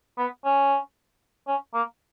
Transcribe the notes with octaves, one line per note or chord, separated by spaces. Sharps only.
B3
C#4
C#4
A#3